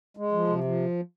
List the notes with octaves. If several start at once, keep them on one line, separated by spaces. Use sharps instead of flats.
G#3
F3
C3
F3